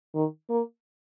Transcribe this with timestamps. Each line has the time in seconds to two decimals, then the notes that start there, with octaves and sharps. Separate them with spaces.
0.15 D#3
0.50 A#3